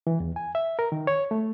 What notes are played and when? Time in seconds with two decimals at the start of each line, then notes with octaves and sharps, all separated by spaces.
0.07 E3
0.20 E2
0.36 G#5
0.55 E5
0.79 A#4
0.92 D#3
1.07 C#5
1.31 A3